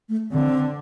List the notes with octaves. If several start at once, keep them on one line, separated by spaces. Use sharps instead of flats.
A3
D3 C4